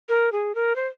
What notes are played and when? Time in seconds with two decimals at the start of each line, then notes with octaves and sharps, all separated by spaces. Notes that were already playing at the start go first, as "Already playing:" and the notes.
0.09 A#4
0.32 G#4
0.55 A#4
0.76 C5